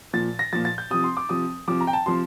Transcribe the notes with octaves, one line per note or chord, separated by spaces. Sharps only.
A#2 F3 A6
A#6
A#2 F3 A6
A6
G6
C3 F3 D#6
C6
D6
C3 F3 D#6
C3 F3 D6
A#5
G5
A5
C3 F3 C6